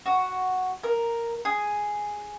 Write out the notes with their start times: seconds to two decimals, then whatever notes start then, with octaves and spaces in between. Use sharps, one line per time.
0.06 F#4
0.84 A#4
1.45 G#4